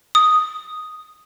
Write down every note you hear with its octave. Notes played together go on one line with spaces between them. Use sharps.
D#6